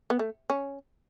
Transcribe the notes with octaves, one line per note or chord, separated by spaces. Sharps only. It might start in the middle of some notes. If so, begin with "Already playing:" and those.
B3
A3
C#4